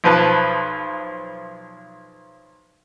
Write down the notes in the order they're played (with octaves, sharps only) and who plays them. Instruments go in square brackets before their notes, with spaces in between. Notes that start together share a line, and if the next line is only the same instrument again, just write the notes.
[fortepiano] B1 F3 B4 A5